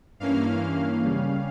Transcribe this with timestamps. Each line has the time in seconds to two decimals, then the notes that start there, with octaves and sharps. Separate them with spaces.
0.20 G2 E3 A#3 C#4 F5
1.03 C#3 G3 C#4